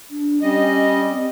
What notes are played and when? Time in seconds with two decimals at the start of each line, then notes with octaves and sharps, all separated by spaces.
0.10 D4
0.42 G3 C#4 D#5
1.10 C4